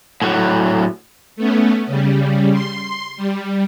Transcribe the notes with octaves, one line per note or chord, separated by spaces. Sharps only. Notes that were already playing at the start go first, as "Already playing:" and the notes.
A2 F#3
A3 B3 C#4
C#3 G3
C6
G3